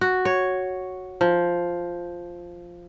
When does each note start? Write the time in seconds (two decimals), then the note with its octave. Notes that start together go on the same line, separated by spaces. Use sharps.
0.01 F#4
0.25 C#5
1.21 F3